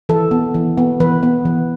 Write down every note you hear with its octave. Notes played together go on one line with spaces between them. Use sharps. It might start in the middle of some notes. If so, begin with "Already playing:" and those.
E3 A4
B3
E3
B3
E3 B4
B3
E3